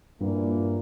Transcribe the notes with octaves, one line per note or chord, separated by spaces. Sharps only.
G2 A#2 E3 A#3